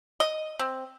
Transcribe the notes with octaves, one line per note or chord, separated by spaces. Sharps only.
D#5
C4